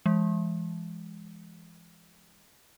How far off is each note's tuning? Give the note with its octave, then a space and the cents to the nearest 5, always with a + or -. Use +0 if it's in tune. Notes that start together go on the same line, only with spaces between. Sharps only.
E3 +40 G#3 +0